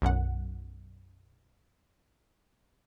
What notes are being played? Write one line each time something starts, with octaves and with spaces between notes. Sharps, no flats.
B1 F#2 F#5